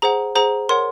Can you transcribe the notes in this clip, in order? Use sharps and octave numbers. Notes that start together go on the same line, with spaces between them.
G#4 C5 F#5 A#5
G#4 C5 F#5 A#5
A#4 C#5 F#5 C6